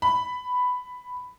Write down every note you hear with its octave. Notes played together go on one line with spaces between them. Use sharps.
B5